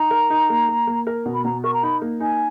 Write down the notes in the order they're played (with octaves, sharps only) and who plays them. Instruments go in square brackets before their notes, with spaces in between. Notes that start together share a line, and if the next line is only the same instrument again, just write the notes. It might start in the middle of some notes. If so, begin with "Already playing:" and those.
Already playing: [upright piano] D#4 [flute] A#5
[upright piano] A#4
D#4
A#3
A#3
A#3
A#4
B2
[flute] B5
[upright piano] B2 [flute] A#5
[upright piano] A#4 [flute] C#6
[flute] A#5
[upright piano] D#4 [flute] B5
[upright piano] A#3
[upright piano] D#4 [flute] G#5